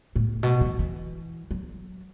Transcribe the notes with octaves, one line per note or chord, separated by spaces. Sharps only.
A2
B2
E3
E3
F#3